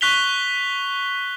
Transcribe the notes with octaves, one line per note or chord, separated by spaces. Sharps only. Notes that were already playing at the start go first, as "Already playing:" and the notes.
C#6 F#6 B6 F7 G7